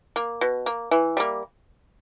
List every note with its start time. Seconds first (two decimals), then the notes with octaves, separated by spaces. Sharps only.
0.16 A#3
0.41 B2
0.66 A#3
0.91 E3
1.17 G3 A#3